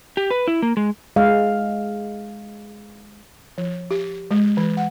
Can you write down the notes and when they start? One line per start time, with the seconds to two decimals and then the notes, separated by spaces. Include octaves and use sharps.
0.17 G4
0.30 B4
0.48 E4
0.62 A#3
0.77 G#3
1.16 G#3 F5
3.58 F3
3.91 G4
4.31 G#3
4.57 E3
4.77 F#5